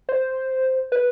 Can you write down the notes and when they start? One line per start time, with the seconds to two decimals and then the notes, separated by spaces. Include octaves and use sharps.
0.09 C5
0.92 B4